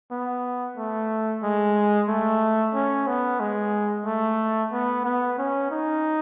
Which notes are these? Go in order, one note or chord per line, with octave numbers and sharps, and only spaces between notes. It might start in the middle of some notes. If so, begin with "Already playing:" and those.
B3
A3
G#3
A3
C#4
B3
G#3
A3
B3
B3
C#4
D#4